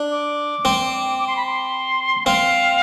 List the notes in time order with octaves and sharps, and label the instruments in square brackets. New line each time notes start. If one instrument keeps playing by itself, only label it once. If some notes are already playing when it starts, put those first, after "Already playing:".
Already playing: [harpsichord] D4
[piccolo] D6
[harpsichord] C4
[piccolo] D6
C6
B5
C6
[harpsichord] C4 [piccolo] F5